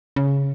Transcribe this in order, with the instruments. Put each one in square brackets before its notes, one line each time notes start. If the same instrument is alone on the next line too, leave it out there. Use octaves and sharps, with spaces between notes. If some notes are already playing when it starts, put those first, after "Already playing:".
[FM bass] C#3